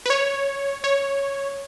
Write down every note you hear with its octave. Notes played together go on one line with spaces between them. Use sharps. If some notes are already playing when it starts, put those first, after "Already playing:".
B4
C#5
C#5